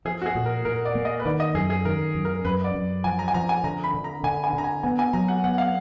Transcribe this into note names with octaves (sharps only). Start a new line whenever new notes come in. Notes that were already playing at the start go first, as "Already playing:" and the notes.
F3 G#4
F#4
G#4
A#2
A#4
A#2 A#4
D5
A#3
D#5
B4
D#3 D5
D#5
F#2 G#4
G#4
D#3 A#4
F#2
A#4
F#2 B4
D5
F#2
F3 G#5
A#5
G#5
F3 A#5
G#5
D3 A#5
B5
D3
A#5
D3 G#5
G#5
D3
A#5
G#5
B3 G#5
G#5
F#3 A#5
F#5
B3 F#5
F5